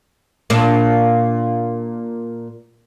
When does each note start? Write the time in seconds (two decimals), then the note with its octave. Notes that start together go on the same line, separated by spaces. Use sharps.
0.50 A#2 D4